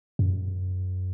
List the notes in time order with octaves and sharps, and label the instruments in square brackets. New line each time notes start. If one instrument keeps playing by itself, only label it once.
[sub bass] F#2